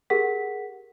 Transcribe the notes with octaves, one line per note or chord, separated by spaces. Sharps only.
G4 G#4 A#4 F#5 B6